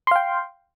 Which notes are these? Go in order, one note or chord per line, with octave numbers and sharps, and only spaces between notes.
F5 G5 C6